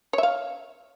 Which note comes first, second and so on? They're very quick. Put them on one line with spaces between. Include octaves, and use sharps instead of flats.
C#5 E5 F5